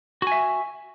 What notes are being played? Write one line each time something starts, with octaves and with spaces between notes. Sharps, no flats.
F#4 E5 G#5